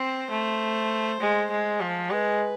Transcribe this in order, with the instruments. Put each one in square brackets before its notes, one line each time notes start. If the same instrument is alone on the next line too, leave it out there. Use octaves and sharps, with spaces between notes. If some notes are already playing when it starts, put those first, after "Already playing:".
Already playing: [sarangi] C4 [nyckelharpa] C5
[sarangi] A3
G#3
G#3
F3
[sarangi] G#3 [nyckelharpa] B4